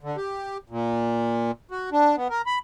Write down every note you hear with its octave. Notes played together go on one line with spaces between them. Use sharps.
D3
G4
A#2
F#4
D4
B3
A#4
B5